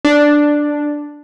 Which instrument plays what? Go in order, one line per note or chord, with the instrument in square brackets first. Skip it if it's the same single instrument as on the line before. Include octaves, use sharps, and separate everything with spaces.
[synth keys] D4